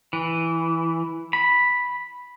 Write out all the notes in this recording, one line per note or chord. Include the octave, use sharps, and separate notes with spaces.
E3
B5